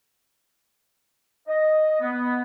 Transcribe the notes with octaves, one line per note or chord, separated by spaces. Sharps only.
D#5
B3